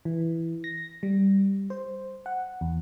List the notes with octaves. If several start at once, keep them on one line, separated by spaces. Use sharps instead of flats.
E3
A#6
G3
C5
F#5
E2